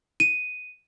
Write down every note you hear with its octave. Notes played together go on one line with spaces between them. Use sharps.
D#7